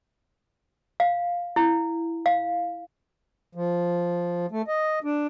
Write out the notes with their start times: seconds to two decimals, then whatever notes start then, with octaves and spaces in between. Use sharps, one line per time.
1.00 F5
1.56 E4
2.26 F5
3.55 F3
4.51 A3
4.68 D#5
5.04 D4